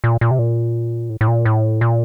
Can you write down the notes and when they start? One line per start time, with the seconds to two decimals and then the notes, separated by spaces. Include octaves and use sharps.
0.04 A#2
0.21 A#2
0.31 C3
0.39 A#2
1.10 A2
1.21 A2
1.28 A#2
1.45 A2
1.81 A#2